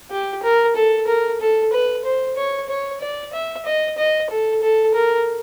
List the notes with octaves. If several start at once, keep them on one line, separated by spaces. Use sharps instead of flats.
G4
A#4
A4
A#4
A4
B4
C5
C#5
C#5
D5
E5
D#5
D#5
A4
A4
A#4